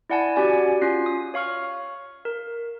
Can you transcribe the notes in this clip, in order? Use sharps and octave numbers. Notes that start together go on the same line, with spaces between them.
E4 D5 F#5 G#5 A5
C#4 F#4 G4 D5 G#5
C#4 F4 C7
D#6
C#5 F5 C#6 F6
A#4